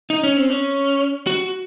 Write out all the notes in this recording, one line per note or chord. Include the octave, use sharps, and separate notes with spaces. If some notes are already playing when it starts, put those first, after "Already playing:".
D#4
C#4
C4
C#4
F#4